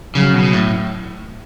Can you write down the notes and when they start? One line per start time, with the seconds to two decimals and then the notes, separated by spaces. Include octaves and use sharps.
0.15 C#3 F#3
0.34 B2
0.53 A2